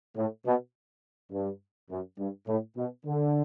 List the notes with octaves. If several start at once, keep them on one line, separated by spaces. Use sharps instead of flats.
A2
B2
G2
F#2
G2
A2
B2
D3